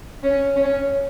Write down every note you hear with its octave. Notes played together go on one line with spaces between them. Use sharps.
C#4
C#4